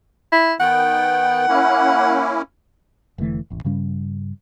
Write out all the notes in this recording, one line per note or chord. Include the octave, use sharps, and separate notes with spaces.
E4
D#3 B3 F#5 G5
A#3 C#4 E4
F1 D3 E3 A3
D#1 A1
G2 C#3 G3 C#4